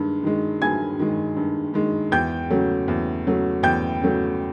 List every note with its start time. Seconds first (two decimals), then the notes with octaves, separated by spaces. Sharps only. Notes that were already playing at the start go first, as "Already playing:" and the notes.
Already playing: G2 D#3 G#3
0.23 D#3 G#3
0.61 G2 G#5 G#6
0.99 D#3 G#3
1.37 G2
1.74 D#3 G#3
2.12 E2 G5 G6
2.50 C#3 F#3 A3
2.88 E2
3.25 C#3 F#3 A3
3.63 E2 G5 G6
4.02 C#3 F#3 A3